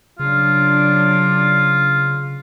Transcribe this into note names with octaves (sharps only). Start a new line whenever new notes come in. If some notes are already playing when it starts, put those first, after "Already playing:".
C#3 F#3 D4 F4